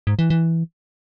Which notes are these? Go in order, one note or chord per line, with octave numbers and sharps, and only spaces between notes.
G#2
E3
E3